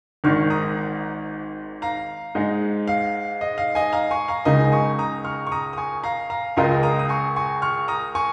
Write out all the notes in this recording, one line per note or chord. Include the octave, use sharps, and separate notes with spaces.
G#1 G#2 D#3 C#6 F6
A#5 D#6
F5 A#5
G#2 G#3 D#4
F5
D#5
F5
D#5 G#5
F5 A#5
G#5 C#6
F5 A#5
C#2 C#3 G#3 D#4 A#4 D#5 G#5
G#5 C#6
A#5 D#6
C#6 F6
C#6
A#5 D#6
D#6
G#5 C#6
F5 A#5
F5 A#5
C#2 C#3 G#3 F4 A#4 D#5 G#5
A#5 D#6
D#6
G#5 C#6
G#5 C#6
C#6 F6
A#5 D#6
G#5 C#6